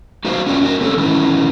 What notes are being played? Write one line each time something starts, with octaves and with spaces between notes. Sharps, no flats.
D#4 F#4 C5 F5
C#4 F4 F#4 D5 G5
C#4 D#4 F#4 A#4
C4 C#4 G4 A4 C#5
D#3 E3 C#4 D#4 E4